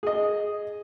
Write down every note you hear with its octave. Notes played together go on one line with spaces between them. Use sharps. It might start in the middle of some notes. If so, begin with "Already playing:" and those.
G#4 D#5